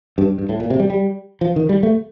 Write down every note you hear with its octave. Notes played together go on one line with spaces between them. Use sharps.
G2
G2
A2
A#2
C3
G3
G3
F3
D#3
G3
A3